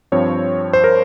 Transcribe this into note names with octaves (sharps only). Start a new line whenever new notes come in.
G2 F3 C4 C#5
C5
A#4